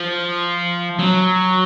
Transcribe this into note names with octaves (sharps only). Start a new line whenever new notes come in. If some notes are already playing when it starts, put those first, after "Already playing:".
Already playing: F3
F#3